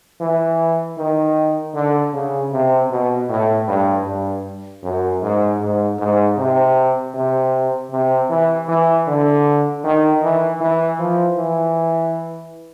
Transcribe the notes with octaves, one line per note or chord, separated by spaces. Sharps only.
E3
D#3
D3
C#3
C3
B2
A2
G2
G2
F#2
G#2
G#2
G#2
C3
C3
C3
E3
E3
D3
D#3
E3
E3
F3
E3